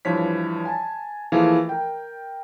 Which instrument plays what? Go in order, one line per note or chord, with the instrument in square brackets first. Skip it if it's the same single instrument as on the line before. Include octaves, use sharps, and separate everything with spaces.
[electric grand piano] G2 E3 F3 C#5 B6
G#5 A5
E3 F3 A3 A#3 G#4 F5
A#4 G5